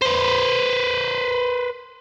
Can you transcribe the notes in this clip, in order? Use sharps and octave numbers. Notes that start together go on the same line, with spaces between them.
B4 C5